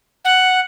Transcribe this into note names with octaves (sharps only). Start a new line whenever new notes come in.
F#5